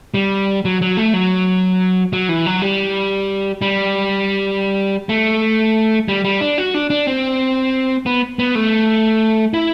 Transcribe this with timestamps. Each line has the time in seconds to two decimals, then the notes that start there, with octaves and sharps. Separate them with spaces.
0.14 G3
0.65 F#3
0.81 F#3
0.97 A3
1.13 F#3
2.13 F#3
2.29 E3
2.46 F#3
2.62 G3
3.62 G3
5.09 A3
6.08 G3
6.24 G3
6.41 D4
6.58 F#4
6.74 D4
6.90 D4
7.07 C4
8.06 B3
8.39 B3
8.55 A3
9.54 E4